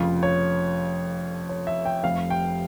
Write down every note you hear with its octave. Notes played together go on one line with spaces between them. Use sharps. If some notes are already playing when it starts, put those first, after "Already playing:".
Already playing: F1 F2 C#3 F4
C#5
C#5
E5
G5
F1 F2 C3 G3 F5
G5